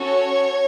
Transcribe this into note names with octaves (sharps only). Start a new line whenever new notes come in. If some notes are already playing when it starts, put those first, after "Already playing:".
Already playing: C#4 F#4 A4 C#5